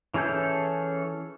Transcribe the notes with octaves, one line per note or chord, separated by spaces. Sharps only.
E3 C#4 G#4 A4 G6